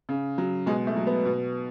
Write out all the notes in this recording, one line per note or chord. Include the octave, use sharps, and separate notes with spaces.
C#3
F#3
B2 G#3
A3
F#3
B3
B2